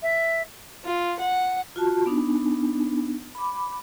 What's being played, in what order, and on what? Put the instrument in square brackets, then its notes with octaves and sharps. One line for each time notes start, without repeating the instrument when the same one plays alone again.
[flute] E5
[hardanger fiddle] F4
F#5
[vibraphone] F4 F#4 A5
B3 D4 D#4
B5 D6